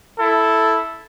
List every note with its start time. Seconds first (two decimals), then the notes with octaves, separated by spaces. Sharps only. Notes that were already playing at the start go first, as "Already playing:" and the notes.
0.18 E4 A4